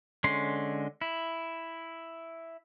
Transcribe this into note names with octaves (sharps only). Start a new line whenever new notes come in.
D3 G#3 C#4 C6
E4